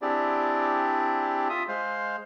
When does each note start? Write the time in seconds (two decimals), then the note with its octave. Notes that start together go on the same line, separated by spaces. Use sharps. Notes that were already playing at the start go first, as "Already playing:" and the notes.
0.02 C4 D4 E4 G4 G#4 D5
1.49 F4 E5 D#6
1.68 G#3 C5 F5